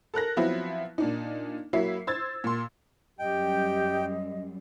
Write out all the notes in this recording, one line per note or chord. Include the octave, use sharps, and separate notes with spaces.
A4 A#4 F#6 A#6
F3 F#3 B3 C4 E4
A#2 D4 D#4
F#3 A#3 E4 E5 C7
C5 E6 G#6 A6
A#2 C6
F#2 G3 G4 D#5 G5